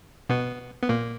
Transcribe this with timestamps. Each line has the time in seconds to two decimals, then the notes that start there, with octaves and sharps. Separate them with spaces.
0.29 B2 B3
0.83 B3
0.89 A#2 A#3